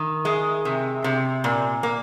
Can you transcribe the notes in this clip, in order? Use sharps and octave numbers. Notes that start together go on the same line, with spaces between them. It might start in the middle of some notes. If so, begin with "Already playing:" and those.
Already playing: D#3
G#3
C3
C3
A#2
A#3